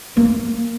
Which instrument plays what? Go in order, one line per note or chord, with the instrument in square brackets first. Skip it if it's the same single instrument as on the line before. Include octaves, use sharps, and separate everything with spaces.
[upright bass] A#3